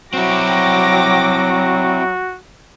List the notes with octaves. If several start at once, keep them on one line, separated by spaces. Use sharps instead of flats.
F#3 C4 E4 F#4 G5 D6 A#6